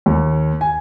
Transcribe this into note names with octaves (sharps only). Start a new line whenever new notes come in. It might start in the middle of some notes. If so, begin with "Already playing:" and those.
D#2
G#5